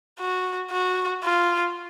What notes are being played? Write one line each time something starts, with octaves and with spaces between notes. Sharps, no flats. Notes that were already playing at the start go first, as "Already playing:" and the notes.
F#4
F#4
F4